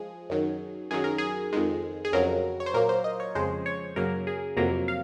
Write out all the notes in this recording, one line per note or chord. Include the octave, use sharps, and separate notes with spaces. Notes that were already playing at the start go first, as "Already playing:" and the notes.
Already playing: F3 G#3 G#4
F#2 D#3 F#3
F#2 D#3 F#3 G#4
A#4
G#4
F2 D#3 G#3
G#4
F2 C#3 F#3 A#4
C#5
C5
A#2 F#3 A#3 A#4
C5
D#5
C#5
F2 C#3 F3 G#3 C5
C#5
F#2 C#3 F#3 A#3 A#4
G#4
F2 C3 F#3 A#3 A#4
F5